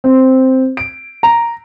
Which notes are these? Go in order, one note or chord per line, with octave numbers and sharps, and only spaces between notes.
C4
D7
A#5